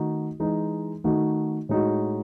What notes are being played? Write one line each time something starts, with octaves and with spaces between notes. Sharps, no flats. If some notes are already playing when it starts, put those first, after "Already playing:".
Already playing: D#3 A3 D#4 F#4
E3 G#3 D#4
D#3 A3 D#4 F#4
A2 G#3 D#4 F#4